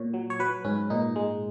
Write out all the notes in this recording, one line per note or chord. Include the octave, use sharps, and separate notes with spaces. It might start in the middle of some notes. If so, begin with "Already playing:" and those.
Already playing: A#2 C#5
F#3
C#5
F#3 B4
G#2 C#4
A#2 D#4
G#3